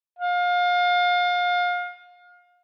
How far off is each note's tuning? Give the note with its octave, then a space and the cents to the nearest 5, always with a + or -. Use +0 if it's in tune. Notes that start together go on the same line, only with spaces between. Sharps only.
F5 +30